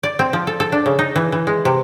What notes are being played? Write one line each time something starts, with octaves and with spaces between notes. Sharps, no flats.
D5
C4
F3
A4
A4
D4
C#3
D#4
E3
E3
G#3
C3